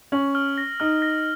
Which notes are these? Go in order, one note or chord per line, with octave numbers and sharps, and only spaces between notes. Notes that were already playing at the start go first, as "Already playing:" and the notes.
C#4 F#7
F6
A#6
D#4 F6
A#6